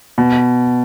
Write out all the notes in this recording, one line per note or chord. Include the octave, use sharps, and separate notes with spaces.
B2